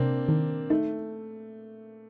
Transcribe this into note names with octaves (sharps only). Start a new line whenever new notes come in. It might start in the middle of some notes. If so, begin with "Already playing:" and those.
Already playing: C3 A#3 C4 D4
D#3 A#3
A3 D#4